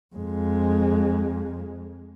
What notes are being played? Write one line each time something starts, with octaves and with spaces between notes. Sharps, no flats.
F2 G#3